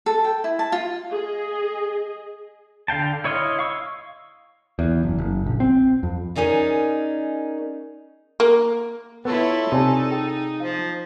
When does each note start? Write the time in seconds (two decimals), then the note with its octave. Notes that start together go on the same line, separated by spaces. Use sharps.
0.06 A4
0.24 G5
0.44 E4
0.59 A5
0.72 F4
1.11 G#4 D#5
2.88 D3 F5 G5 A5
3.24 E4 C#5 D#5 F5 C6
3.59 F5 C#6 E6
4.79 E2
5.03 F#1
5.18 F#1
5.46 A#1
5.60 C4
6.03 F2
6.36 C#4 D#4 G#4 A#4 D5
8.40 A#3
9.25 B3 E4 F4 A4 C#5
9.72 C3 D#4 D5 G#5 A5
10.10 G#4 G5
10.60 F3 F5